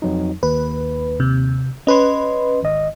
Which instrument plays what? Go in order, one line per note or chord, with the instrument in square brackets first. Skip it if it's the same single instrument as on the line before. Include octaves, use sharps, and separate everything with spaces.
[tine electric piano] F2 F#3 D#4
[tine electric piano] D#2 [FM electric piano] B4
[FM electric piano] C3
[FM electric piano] C#4 B4 [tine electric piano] D#5 C6
[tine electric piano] G#1 D#5